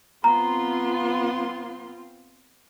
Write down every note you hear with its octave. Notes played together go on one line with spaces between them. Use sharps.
B3 C4 F4 A#5 C6